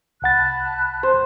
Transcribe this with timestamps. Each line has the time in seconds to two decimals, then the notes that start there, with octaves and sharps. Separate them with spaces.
0.22 C2 F#5 A5 B5 F#6 A6
1.03 C5